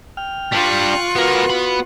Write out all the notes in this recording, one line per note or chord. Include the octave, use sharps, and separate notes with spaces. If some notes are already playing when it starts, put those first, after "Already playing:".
G5 F6
G3 D4 F4 C#6 F#6
B3 F#4 A#4 B4
B3 B5